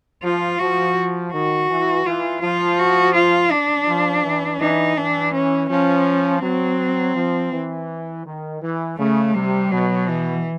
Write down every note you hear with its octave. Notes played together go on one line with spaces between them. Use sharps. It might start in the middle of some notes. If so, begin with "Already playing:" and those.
F3 F4
F3 F#4
D#3 F#4
E3
E3 F4
F3 F4
F#4
F4
D4
F3
E3
E3 D#4
E3 D4
C#4
F3 C#4
F#3 C4
F3
E3
D#3
E3
C#3 A3
C3 G3
B2 F#3
E3